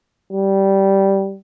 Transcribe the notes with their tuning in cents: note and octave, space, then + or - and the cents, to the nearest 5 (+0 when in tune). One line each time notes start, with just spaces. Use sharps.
G3 -10